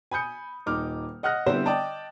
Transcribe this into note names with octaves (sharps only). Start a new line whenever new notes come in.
G#5 B5 D#6 G6 C#7
D#1 D#4 D6 F6
D#5 F#5 F6 F#6 A#6
D3 G3 B3 C4 E4 C5
D5 D#5 G5 A5